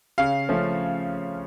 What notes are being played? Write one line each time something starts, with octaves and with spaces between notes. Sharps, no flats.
C#3 F5
F3 A3 C#4